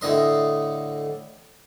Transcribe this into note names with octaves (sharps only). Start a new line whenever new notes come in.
A2 D3 D#5 C6